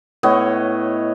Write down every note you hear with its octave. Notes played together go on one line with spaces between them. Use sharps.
A2 B3 C#5 D#5